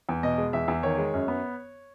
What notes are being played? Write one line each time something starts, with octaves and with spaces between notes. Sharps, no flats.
E2
B2 D#5
G#3
E2 E5
E2
D#3 C#5
G#3
F#2
B3